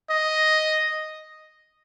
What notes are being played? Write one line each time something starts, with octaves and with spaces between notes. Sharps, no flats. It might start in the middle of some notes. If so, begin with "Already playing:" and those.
D#5